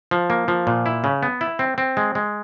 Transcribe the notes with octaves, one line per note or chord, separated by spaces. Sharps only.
F3
A#3
F3
A#2
E4
C#3
B3
E4
C4
C4
G#3
G#3